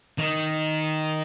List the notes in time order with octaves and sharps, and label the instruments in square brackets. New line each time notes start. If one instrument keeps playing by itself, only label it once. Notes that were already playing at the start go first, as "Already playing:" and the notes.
[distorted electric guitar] D#3